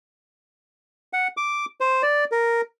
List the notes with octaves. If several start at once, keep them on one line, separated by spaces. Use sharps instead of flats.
F#5
D6
C5
D5
A#4